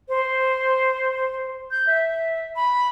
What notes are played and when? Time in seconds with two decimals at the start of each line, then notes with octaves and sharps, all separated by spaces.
0.08 C5
1.71 G6
1.86 E5
2.55 B5